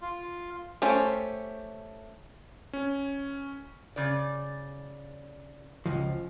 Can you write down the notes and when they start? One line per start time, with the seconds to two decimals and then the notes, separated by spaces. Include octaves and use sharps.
0.01 F4
0.82 A3 C#4 G4 C5
2.73 C#4
3.96 C#3 D5
5.86 C#2 F3